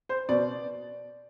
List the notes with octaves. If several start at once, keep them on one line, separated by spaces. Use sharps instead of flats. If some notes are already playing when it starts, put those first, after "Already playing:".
C5
B2 D5